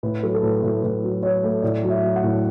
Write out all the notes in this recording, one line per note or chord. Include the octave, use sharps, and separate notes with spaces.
A2 B4
F#3 A4
A4
A2 B4
A2 A4
A2 B4
F#3
F#3 C#5
A3
A2 D5
F#3
E5
F#3
F#5
A2